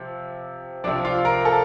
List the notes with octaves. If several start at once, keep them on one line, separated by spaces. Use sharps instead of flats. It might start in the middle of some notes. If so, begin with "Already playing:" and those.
Already playing: C3 F3
C3 F3 D4 D5
F4 F5
A#4 A#5
A4 A5